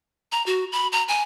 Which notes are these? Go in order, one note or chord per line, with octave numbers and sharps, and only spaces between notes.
A#5
F#4
B5
A#5
G#5